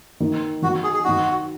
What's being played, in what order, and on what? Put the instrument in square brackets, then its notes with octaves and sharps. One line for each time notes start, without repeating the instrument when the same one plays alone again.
[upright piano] D#3 A#3 D#4
[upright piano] D#3 F#3 D#4 [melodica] F#4
[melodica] G#4
G#4
[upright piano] D#3 F#3 D#4 [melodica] F#4